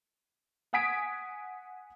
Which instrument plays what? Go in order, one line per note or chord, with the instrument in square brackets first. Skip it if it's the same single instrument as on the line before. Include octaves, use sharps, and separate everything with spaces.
[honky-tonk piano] F#5 G#5 D#6 G#6 B6 D7